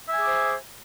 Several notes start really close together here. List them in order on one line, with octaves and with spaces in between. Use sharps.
E5 G#5 G#4 D6 C5